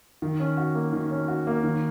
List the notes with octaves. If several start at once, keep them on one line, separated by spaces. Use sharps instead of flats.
D#3
C#4
F#4
A#3
D#3
C#4
F#4
A#3
D#3